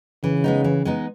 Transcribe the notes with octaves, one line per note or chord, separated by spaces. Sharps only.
C#3 E3
G#3 B3 D#4
E3
G#3 B3 D#4